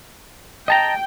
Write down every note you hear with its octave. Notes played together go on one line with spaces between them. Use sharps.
D#5 G5 A5 A#5